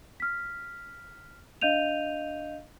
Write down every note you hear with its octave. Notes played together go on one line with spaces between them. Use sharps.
F6 B6
D4 D#5 F5 G6 D#7 F7